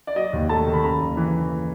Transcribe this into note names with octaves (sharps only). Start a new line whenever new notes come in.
D5
F#3 D#5
D#2
A3 A5
D#3
B5
C#3 A#5
F#1
E3